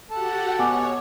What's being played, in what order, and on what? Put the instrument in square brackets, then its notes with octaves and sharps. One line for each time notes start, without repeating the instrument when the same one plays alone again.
[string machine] F#4 G4 F#5 [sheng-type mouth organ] A4 A5
[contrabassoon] B2 [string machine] C#5 [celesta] G#5 D6